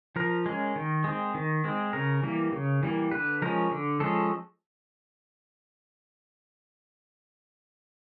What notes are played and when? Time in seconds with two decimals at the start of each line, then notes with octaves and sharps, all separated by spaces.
0.16 F3 A#4
0.46 G#3 C#4
0.76 D#3
1.04 G#3 C4
1.34 D#3
1.64 G#3 C4
1.93 C#3 A#4
2.23 E3 G3 A#3
2.52 C#3
2.83 E3 G3 A#3
3.11 D3 B4
3.42 F3 G#3 C#4 A#4
3.71 D3
4.00 F3 G#3 C#4 A4